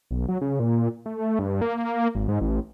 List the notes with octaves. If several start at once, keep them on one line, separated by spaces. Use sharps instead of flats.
B1
F#3
C#3
A#2
A3
G2
A#3
G#1
G#2
A1